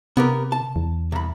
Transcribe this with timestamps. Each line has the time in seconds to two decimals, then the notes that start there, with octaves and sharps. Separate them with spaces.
0.17 C3 B3 G4 A#4
0.52 A5
0.76 E2
1.12 C2 B5